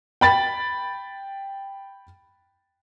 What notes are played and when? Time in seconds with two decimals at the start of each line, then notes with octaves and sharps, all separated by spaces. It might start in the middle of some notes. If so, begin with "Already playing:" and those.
0.21 G5 B5 A6